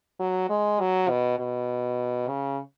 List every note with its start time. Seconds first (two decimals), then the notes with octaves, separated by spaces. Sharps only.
0.20 F#3
0.50 G#3
0.80 F#3
1.09 B2
1.39 B2
2.28 C#3